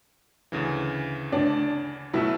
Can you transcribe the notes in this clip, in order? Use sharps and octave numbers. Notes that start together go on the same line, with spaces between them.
D2 C#3 E3
D4
B2 F#3 A3 E4